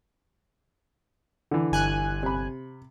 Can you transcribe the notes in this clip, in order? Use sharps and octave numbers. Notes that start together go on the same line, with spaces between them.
D3 E3
G1 G#5 F#6
C3 B5